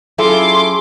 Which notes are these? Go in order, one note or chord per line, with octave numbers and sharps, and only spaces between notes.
F#3 C#4 E4 F4 G#4 A4 C6 D6